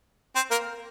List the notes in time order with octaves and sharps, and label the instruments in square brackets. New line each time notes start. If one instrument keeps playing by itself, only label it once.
[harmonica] C4 C5
A#3 A#4